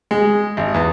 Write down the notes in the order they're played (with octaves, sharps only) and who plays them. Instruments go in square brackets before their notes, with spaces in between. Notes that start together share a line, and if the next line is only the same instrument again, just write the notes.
[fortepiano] G#3
G#1
E2